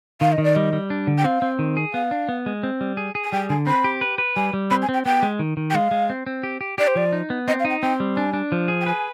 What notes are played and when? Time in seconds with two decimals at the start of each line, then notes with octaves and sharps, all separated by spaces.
0.21 D#3 F5
0.32 D#5
0.38 D#3
0.44 D5
0.55 G3 D#5
0.73 G3
0.90 D4
1.07 D3
1.18 G5
1.24 C4 F5
1.42 C4
1.59 D#3
1.77 G#4
1.93 B3 F5
2.11 D4
2.29 B3
2.46 G#3
2.63 C4
2.81 G3
2.97 G#4
3.15 G#4
3.24 G#5
3.32 G3 G5
3.49 D3 G#5
3.67 C4 B5
3.84 G4
4.01 B4
4.18 B4
4.36 G3 G#5
4.53 G3
4.70 C4 B5
4.82 G#5
4.89 C4
4.94 G5
5.05 B3 G5
5.23 G#3
5.39 D#3
5.57 D#3
5.70 G5
5.74 G#3 F5
5.91 G#3
6.10 C4
6.26 C4
6.43 G4
6.61 G4
6.78 G4 D5
6.87 C5
6.96 F3 D5
7.12 D#4
7.30 B3
7.48 C4 D#5
7.60 F5
7.65 D#4
7.70 G5
7.82 C4 G5
8.00 G3
8.16 D4 G#5
8.33 D4
8.52 F3
8.68 G#4
8.81 G5
8.86 B4 G#5